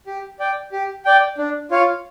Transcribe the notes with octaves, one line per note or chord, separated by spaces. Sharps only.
G4
D5 G5
G4
D5 G5
D4
F4 C#5 F5